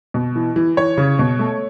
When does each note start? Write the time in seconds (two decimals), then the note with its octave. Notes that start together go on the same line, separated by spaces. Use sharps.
0.14 B2
0.36 E3
0.56 E3
0.77 E3 C#5
0.97 C#3
1.19 B2
1.39 A3